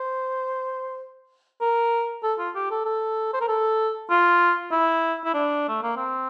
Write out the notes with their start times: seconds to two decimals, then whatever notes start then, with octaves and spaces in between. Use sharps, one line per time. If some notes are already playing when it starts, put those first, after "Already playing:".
Already playing: C5
1.61 A#4
2.23 A4
2.39 F4
2.55 G4
2.71 A4
2.85 A4
3.33 C5
3.41 A#4
3.48 A4
4.10 F4
4.72 E4
5.25 E4
5.34 D4
5.68 A3
5.83 A#3
5.96 C4